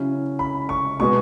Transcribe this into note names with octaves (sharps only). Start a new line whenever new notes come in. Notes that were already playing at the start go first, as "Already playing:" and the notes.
Already playing: C#3 F#3 C#4 E4
B5
C#6
B2 G#3 B3 C#6